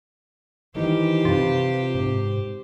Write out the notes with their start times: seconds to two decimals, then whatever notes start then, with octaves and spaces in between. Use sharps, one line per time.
0.75 D#3 E3 D#4 G4 C5
1.25 C3 F4 B4
1.95 G#2